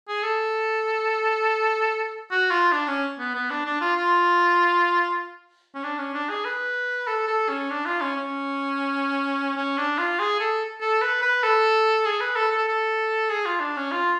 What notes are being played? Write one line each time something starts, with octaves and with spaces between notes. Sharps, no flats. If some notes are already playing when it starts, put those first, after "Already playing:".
G#4
A4
F#4
F4
D4
C#4
B3
B3
D4
D4
F4
F4
C#4
D4
C#4
D4
G#4
B4
A4
A4
C#4
D4
F4
C#4
C#4
C#4
D4
F4
G#4
A4
A4
B4
B4
A4
G#4
B4
A4
A4
A4
G#4
F4
D4
C#4
F4